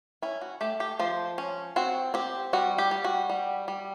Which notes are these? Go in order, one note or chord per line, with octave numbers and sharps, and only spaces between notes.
C#4 E4
F#4
A3 G4
G4
F3 C5
C#4
C4 F#4
C4 G4
G3 F#4
G4
G3
F#4
G3
G3